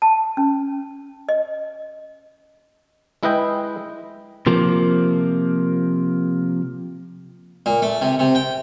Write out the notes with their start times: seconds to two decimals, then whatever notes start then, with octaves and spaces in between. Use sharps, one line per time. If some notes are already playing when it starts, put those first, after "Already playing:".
0.02 A5
0.37 C#4
1.29 D#5
3.23 G#3 E4 B4 D#5 G5
4.47 C3 F3 A#3
7.66 A#2
7.82 A3
8.01 C3
8.19 C3
8.35 G5